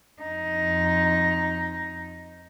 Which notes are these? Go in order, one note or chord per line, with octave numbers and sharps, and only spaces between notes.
F2 D#4